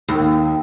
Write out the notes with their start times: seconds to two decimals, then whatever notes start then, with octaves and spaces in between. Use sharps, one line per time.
0.08 D#2